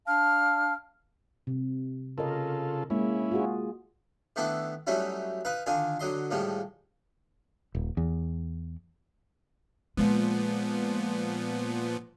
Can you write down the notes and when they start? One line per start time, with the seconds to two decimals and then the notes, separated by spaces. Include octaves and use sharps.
0.06 D4 F5 A5 F6
1.47 C3
2.18 C#3 F4 A4 A#4 D#5
2.90 G#3 A#3 C#4 E4
3.32 F4 F#4 G#4
4.36 D#3 A3 B3 D4 E4 A4
4.87 F#3 G3 A3 C#4 D#4 E4
5.45 D#4 B4 F5
5.66 D3 D#3 D4 F4 G#5
6.00 D3 F#3 D#5 C6
6.31 A2 D#3 F3 G3 G#3
7.75 D#1
7.97 E2
9.97 A#2 F3 G#3 B3